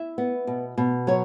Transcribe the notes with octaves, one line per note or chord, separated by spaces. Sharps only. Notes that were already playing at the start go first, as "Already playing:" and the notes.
Already playing: E4 E5
B3
B2
B2
F#3 C#5